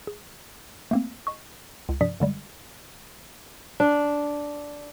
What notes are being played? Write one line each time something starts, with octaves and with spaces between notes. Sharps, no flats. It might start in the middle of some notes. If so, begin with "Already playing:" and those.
G#4
A3 A#3 C4
D#5 C#6
C#2
G2 C3 F3 D5 D#6 B6
F#2 D3 G3 G#3
D4